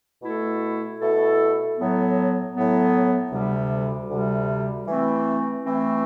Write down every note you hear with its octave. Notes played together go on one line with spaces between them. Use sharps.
B2 A3 E4 A4
B2 A3 E4 A4
A2 F#3 B3
A2 F#3 B3
D2 C3 G3
D2 C3 G3
E3 A3 C4
E3 A3 C4